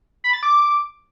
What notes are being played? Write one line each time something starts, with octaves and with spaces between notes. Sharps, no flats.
B5
A6
D6